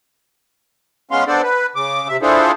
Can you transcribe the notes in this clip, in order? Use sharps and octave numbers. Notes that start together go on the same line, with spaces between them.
G#3 B3 C#4 F5 C6
B3 D4 A4 C5 D5
B4
C#3 D6
C3 E5
D4 E4 F4 G#4 A4 C5